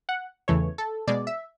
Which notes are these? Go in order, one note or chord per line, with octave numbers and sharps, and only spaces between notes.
F#5
E2 C#3 E3 A3 C#5
A4
B2 G#3 D5
E5